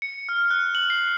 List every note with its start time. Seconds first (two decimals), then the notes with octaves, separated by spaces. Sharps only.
0.02 C#7
0.29 F6
0.51 F#6
0.75 F#7
0.90 C7